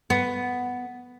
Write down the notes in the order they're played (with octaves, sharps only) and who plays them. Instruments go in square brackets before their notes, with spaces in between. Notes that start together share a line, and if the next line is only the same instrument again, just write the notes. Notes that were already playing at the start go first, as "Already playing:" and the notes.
[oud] B3